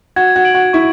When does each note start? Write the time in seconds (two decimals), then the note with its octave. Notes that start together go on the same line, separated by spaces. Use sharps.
0.16 F#4 G#6
0.36 F#4
0.45 D7 F#7
0.54 F#4
0.73 E4 C#6